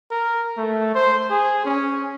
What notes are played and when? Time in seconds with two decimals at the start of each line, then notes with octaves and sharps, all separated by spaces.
0.11 A#4
0.57 A3
0.95 C5
1.30 G#4
1.65 C#4